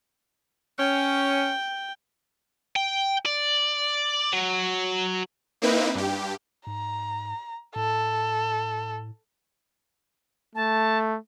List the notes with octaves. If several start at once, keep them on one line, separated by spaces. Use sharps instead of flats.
C#4 G5
G5
D5
F#3
A#3 C4 D#4 E4 B4
G2 G4
G#2 A#5
A2 A4
A3 A5